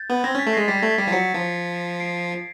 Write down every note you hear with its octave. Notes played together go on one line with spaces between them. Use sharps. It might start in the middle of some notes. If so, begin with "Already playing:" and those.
Already playing: G6 A6
B3
C4 G#6 A#6
C#4 A6 B6
A3
G#3 A#6 C7
G3 A6 B6
A3 G#6 A#6
A6 B6
G3
F3
F#3 B6 C#7
F3
C7 D7